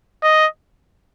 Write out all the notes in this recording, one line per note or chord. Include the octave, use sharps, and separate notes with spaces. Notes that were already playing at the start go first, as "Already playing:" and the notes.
D#5